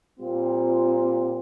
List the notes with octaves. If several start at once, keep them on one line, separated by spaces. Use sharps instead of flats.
A#2 G3 C4 F4